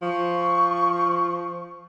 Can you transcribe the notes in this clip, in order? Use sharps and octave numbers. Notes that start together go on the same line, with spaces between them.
F3 C#6